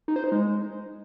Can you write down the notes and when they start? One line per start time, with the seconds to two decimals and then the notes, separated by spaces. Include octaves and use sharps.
0.08 D#4
0.16 C5
0.24 D#4
0.32 G#3